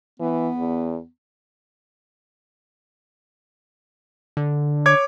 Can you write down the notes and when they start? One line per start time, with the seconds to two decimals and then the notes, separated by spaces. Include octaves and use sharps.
0.20 E3 B3
0.58 E2
4.37 D3
4.86 C#5 D6 G#6